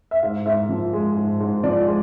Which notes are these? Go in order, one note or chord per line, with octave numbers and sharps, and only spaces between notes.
E5
G#2 F5
G#2 E5
F3
G#3
G#2
G#2
F3 D5
G#3